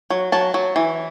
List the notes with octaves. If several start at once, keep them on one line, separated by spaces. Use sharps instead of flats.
F#3
F#3 A5
F#3
E3